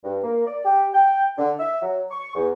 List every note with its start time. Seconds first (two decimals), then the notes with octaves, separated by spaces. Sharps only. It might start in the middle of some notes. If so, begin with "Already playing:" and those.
0.04 G2
0.24 A#3
0.46 D5
0.65 G4
0.94 G5
1.38 D3
1.59 E5
1.82 F#3
2.11 C#6
2.35 E2